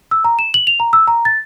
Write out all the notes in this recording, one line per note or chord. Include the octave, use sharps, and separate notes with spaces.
E6
A#5
E7
F#7
F7
A#5
E6
A#5
A6